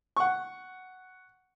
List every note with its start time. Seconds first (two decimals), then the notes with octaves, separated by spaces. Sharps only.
0.17 F#5 C#6